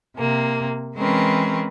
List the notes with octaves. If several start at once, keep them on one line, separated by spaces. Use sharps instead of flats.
C3 A#3
E3 G#3 C4 C#4 A#4 B4